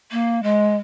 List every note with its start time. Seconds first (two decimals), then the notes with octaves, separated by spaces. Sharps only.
0.11 A#3
0.43 G#3